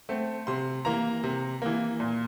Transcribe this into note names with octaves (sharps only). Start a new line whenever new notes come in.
A3 C4
C3 C6
E3 A#3 A#5
C3
E3 A#3
A#2